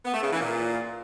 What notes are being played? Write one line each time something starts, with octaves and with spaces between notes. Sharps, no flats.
B3
A3
C#3
E3
A#2